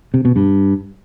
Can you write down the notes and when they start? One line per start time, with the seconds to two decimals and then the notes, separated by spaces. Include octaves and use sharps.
0.14 C3
0.25 B2
0.36 G2